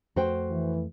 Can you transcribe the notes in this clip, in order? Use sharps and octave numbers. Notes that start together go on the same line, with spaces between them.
F2 A3 F#4 C5 G5
E3